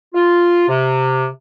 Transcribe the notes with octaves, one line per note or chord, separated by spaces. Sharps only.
F4
C3